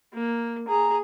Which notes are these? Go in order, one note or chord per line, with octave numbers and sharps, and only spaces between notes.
A#3
G#4 A#5